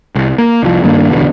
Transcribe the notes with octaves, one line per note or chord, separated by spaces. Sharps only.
C2
A#3
C2 F3
G2 D#3 A#3 D4
E1 C#2 B2 D3